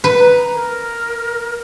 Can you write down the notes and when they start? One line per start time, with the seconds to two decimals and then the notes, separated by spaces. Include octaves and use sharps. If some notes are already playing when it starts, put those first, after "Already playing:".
0.04 B4
0.20 A#5
0.54 A#4